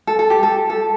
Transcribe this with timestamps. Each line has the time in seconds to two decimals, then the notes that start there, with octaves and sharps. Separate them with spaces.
0.07 A4
0.19 A4
0.30 G4
0.43 A4
0.70 A4